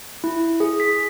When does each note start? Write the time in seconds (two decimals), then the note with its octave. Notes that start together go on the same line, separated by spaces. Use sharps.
0.24 E4
0.60 G#4
0.80 B6